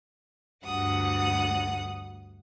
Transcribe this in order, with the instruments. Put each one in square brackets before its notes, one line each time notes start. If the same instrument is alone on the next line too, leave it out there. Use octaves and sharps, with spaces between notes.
[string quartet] D2 G2 F#5 D#6